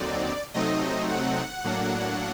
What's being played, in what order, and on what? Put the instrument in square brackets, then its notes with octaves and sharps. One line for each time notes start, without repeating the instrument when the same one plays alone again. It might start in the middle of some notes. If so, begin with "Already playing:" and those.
Already playing: [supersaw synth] D#2 D3 F#3 C4 D#4 D5
C3 F#3 A3 C4 D#4 D#5
F#5
A2 F#3 A#3 D4